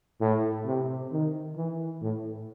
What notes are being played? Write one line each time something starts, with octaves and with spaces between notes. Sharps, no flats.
A2
C3
D#3
E3
A2